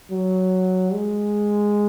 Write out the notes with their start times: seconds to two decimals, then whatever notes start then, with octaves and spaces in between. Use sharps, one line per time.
0.11 F#3
0.93 G#3